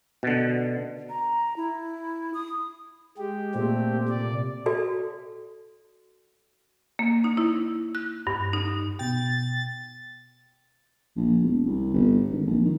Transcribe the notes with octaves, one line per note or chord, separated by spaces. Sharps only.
B2 D3
A#5
E4
D#6
G#3 G4
A#2 A3 C4 G4
C3 D5
F#4 A4 D5
A#3
D#4
E4
F#6
G2
D#4
B2 G5 A6
A#1
E1
C2
G1
G#1
A#1
D#3